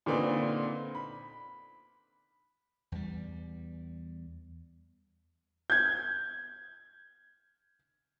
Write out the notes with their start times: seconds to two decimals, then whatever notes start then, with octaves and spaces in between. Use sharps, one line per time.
0.06 A#2 D3 C4 D#4 B4
0.95 B5
2.92 E2 G3
5.70 G6 G#6